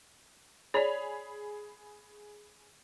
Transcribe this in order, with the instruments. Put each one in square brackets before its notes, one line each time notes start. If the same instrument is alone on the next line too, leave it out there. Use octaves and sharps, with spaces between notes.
[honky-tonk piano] G#4 B5 F7 [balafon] C#5 D5